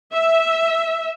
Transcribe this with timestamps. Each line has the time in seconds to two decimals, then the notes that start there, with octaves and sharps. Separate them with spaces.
0.14 E5